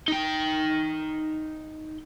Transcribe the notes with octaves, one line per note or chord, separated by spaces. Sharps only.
D#4 G5